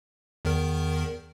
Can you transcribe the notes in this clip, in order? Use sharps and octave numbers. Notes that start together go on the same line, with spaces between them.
E2 D#3 A#4